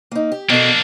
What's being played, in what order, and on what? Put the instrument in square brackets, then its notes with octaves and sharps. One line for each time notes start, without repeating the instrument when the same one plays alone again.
[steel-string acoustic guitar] A#3 D#4
G4
[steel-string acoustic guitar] B2 A4 [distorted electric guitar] A#3 D4